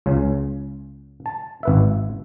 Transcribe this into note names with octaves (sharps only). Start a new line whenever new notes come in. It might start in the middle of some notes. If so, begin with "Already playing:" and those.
C#2 C#3
A5
G#1 B4 E5